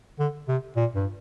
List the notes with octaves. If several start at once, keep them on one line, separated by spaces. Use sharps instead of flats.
D3
C3
A#2
G2